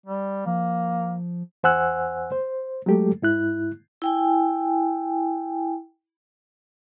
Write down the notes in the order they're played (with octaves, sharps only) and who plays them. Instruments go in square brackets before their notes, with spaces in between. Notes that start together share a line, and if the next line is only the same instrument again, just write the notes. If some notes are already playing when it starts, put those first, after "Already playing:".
[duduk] G3
[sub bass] F3 [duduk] A#3
[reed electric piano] E2 C5 F#5 G#5 E6 F#6
C5
F#3 G#3 A3 G4 A4
G#2 E4 F#6
[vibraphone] E4 G5 G#5